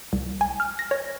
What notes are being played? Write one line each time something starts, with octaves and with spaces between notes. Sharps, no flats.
C2
G#5
F6
A#6
C#5